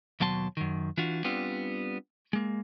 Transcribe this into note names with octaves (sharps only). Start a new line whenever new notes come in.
D#2 B2 F#3 A5 C6
F#2 D#3
E3 D4 F4 F#4
G3 B3 C4 D4 F4
G#3 A#3